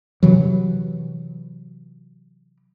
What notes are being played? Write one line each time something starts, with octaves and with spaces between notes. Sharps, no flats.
C3 E3 F#3